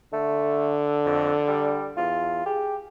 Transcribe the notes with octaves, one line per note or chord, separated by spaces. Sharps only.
D3 A3
F2
G3
E2 F4
G4 G#4